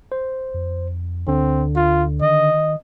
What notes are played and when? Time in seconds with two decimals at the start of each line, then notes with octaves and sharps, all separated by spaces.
0.12 C5
0.54 F2
1.27 D2 D3 C4
1.76 F4
2.22 D#3 D#5